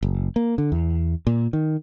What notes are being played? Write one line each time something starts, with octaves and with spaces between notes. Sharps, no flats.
F#1
A#3
D3
E2
A#2
D#3